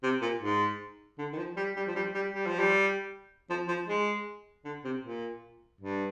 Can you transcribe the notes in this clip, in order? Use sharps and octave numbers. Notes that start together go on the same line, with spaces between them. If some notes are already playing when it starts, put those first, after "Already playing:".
C3
A#2
G#2
D3
D#3
F3
G3
G3
F3
G3
G3
G3
F3
G3
F3
F3
G#3
D3
C3
A#2
G2